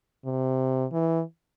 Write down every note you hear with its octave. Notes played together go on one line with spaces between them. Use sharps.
C3
E3